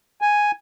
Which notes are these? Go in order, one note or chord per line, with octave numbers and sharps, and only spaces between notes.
G#5